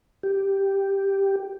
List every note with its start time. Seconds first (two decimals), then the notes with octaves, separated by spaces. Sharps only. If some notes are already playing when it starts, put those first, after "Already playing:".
0.23 G4